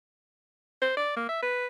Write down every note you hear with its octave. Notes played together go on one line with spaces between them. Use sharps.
C5
D5
A#3
E5
B4